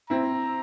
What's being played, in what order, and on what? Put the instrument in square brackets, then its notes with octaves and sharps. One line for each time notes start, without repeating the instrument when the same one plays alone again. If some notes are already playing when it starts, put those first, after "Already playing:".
[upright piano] C4 E4 [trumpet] A#5